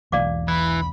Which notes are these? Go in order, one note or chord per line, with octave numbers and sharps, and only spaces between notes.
E1 B1 E2 D5 F5 D6
E3 B5